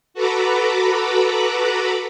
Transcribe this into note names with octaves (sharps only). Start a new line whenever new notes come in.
F#4 A4 B4 A#5 B5 D6